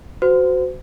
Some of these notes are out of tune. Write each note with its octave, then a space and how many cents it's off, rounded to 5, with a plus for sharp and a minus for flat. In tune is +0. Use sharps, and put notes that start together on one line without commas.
F#4 +5 C5 -35